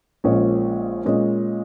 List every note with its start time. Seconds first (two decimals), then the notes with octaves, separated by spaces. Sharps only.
0.24 A#1 A#2 G#3 C#4
1.05 A#2 G#3 C#4